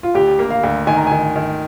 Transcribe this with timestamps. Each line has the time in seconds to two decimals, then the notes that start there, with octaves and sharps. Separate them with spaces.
0.03 F4
0.14 D2 G4
0.39 A#3
0.51 F5
0.63 D2
0.87 D#3 G#5
0.97 A#5
1.07 D#3 G#5
1.36 D#3